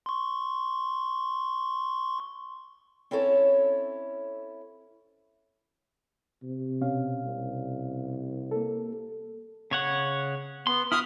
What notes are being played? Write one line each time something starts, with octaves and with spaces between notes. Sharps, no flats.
C6 C#6
C4 C#4 E4 A4 C#5
C3
B2 C#4 F5
C2
A#3 A4
C#3 C#5 F#5
B3 C6
E4 F#4 B4 D#6 F6